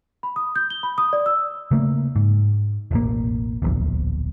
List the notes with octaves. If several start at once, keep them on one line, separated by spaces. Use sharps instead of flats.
B5
D#6
G6
G7
B5
D#6
D5
E6
C#3 A3 A#3
G#2
E1 A1 A#3
D1 A#1 E2